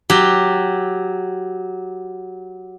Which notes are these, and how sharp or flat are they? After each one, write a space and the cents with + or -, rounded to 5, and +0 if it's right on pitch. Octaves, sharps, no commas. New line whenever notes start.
F#3 +0 G4 +0